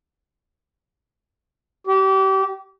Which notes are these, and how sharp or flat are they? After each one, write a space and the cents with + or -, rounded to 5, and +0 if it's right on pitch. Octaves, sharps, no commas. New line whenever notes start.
G4 -30